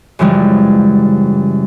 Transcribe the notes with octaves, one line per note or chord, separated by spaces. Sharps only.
F#2 C#3 E3 F3 G3 G#3